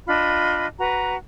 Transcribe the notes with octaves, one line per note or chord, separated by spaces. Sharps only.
D4 F4 D#5 B5
F#4 B4 A#5